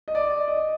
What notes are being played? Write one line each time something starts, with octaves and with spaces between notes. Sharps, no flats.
D#5
D5
D#5